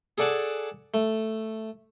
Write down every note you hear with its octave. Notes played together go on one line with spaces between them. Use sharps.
G#4 A4 D5 F#5 G#5 A5
A3